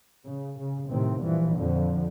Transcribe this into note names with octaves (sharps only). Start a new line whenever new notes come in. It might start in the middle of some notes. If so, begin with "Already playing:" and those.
C#3
C#3
A2 C3 D#3 C4
G2 A#2 E3 F3
F2 D3 F3